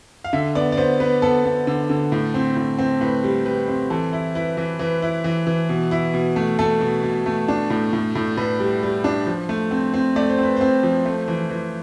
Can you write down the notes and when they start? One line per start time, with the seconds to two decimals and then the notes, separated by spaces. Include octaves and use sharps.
0.24 F5
0.33 D3 E5
0.55 B3 D5
0.72 D5
0.77 B3 C5
1.00 B3 B4
1.22 B3 A4
1.45 B3
1.67 D3
1.89 D3
2.12 A2
2.34 C4
2.56 A2
2.78 C4
3.01 A2 B4
3.24 G3
3.46 G3 B4
3.68 C4
3.90 E3 A4
4.13 E4
4.35 E4 B4
4.57 E3
4.79 E3 B4
5.02 E4
5.24 E3
5.47 E3
5.69 B2
5.91 E4
6.14 B2
6.36 A3
6.59 A3 A4
6.81 B2
7.03 B2
7.26 A3
7.48 D4
7.70 A2
7.93 A2
8.15 A2
8.37 A2 B4
8.60 G3
8.83 G3
9.04 D4
9.26 F3
9.49 A3
9.71 C4
9.94 C4
10.16 A3 D5
10.30 C5
10.39 C4 B4
10.57 C4 C5
10.83 F3
11.05 A3
11.28 E3
11.50 E3